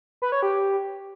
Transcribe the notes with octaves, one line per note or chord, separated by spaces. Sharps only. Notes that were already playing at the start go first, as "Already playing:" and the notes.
B4
C#5
G4